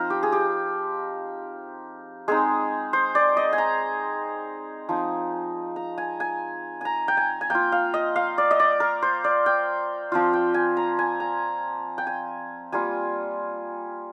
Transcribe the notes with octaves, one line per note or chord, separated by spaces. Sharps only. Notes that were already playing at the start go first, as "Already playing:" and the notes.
Already playing: F3 C4 D#4 A#4 C5
G4
G#4
G4
G#3 C4 D#4 G#4
C5
D5
D#5
G#5
A#5
F3 C4 D#4
A#5
G#5
G#5
G#5 A#5
G5
G#5
G#5
A#3 F4 G5
F5
D#5
F5
D5
D#5
D5
A#4
C5
D5
G5
F3 C4 F4
G5
G#5
A#5
G#5
A#5
G5
G#5
G3 A#3 F4 G#5